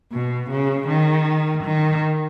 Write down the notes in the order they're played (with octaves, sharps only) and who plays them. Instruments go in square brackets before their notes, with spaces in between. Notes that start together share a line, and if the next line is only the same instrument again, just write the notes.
[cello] B2
C#3
D#3
D#3